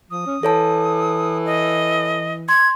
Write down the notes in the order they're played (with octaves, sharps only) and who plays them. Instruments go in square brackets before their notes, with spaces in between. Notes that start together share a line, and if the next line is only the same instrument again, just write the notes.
[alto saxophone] F3 [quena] D#6
[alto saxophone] C#4
[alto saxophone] E3 [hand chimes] A4 C#5 A5
[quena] D#5
[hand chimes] C6 [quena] G#6